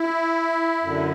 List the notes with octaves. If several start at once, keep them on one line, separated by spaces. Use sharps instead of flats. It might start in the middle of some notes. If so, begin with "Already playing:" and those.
Already playing: E4
F#2 D3